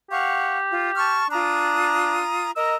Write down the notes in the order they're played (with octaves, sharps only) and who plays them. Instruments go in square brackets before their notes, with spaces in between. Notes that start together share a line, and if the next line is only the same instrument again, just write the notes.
[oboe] G4 [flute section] F5 F#5 C#6
[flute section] F4
A5 C#6 F6
[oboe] D4 [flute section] F4 A#5 D#6
[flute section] A#4 D#5 A#5 [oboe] E6